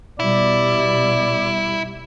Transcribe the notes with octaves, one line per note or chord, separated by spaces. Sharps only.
B2 G3 E4 D5